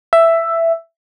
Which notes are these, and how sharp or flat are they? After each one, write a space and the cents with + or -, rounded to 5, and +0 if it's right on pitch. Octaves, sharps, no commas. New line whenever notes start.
E5 +10